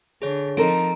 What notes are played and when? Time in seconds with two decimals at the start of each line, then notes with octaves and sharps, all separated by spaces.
0.22 D3 G#4 C#5
0.57 F3 C4 D#4 A4 A#4 A#5 D7